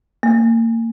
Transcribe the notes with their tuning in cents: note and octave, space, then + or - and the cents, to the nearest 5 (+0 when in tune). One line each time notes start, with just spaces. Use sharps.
A#3 -30